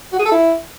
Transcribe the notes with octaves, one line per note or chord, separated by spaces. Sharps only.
F#4
G#4
A4
E4